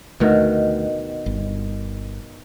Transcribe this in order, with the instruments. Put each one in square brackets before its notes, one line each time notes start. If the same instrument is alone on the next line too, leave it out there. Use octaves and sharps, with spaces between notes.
[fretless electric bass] D2 A3 [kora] B2 D#3 F#4
[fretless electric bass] G1